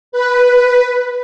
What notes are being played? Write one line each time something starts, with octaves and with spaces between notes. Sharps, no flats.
B4